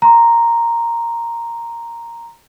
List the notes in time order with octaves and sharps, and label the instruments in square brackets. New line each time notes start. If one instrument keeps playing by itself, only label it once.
[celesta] A#5 C6